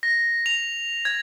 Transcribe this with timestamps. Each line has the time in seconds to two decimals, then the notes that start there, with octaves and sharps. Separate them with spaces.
0.03 A#6
0.46 F7
1.05 G#6